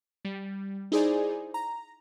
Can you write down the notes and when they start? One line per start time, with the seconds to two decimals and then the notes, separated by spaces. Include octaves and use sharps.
0.25 G3
0.92 D#4 E4 G#4 C5 D5 G#5
1.54 A#5